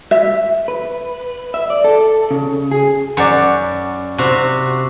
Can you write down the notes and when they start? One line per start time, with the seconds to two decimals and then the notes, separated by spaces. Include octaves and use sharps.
0.11 E5
0.68 B4
1.54 E5
1.70 D5
1.84 A4
2.31 C#3
2.71 G#4
3.17 F#2 D5 F#5 C#6
4.18 C3 F#4